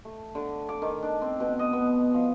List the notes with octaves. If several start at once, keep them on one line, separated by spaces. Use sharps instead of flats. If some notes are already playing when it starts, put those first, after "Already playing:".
A3
D3
D6
D#3
D4
C4
B2
D#5
B3
F3